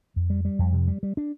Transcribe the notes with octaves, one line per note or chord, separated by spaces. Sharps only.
F2
G3
G3
F2
C3
G3
G3
D4